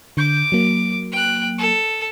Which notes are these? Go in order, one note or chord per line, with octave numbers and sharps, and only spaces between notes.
D3 D6 G6
F#3 A#3
G5 F#6
A4